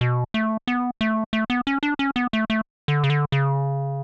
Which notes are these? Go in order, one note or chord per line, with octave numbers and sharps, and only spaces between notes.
B2
A3
B3
A3
A3
B3
C#4
D4
C#4
B3
A3
A3
D3
C#3
D3
C#3